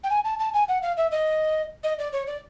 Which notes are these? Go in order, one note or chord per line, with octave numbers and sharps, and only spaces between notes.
G5
G#5
A5
A5
G#5
F#5
F5
E5
D#5
D#5
D5
C#5
D5